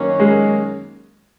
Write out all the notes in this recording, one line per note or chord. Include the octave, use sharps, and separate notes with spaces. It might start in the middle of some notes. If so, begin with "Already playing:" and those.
Already playing: F#2 D#3 F#3 A#3 C#4
G#3